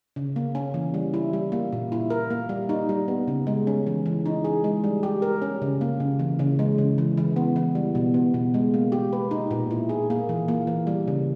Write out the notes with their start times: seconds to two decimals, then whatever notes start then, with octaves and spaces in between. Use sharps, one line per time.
0.16 C#3
0.36 A#3
0.55 C#4
0.74 E3
0.94 G3
1.14 E4
1.33 G3
1.52 A#3
1.72 A#2
1.92 E4
2.10 A#4
2.30 A#3
2.49 G3
2.69 D#4
2.89 G3
3.08 B3
3.28 C#3
3.47 G#3
3.67 C#4
3.87 E3
4.06 E3
4.26 D#4
4.44 G#4
4.64 G#3
4.84 G3
5.03 G4
5.22 A#4
5.42 C#4
5.62 C#3
5.81 A#3
6.00 C#3
6.19 E3
6.39 C#3
6.59 G#3
6.78 C#3
6.98 E3
7.17 E3
7.36 B3
7.56 E3
7.75 G3
7.95 B2
8.14 B3
8.34 B2
8.54 G#3
8.74 A#3
8.92 G4
9.13 B4
9.31 D#4
9.51 A#2
9.71 E4
9.89 G#4
10.10 A#3
10.29 E3
10.48 A#3
10.67 E3
10.87 G3
11.08 C#3